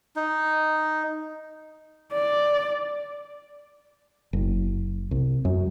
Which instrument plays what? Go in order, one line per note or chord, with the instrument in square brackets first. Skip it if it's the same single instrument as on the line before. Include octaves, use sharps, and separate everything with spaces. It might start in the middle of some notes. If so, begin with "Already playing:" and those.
[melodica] D#4
[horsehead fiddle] D5
[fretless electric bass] F#1
C2
F#2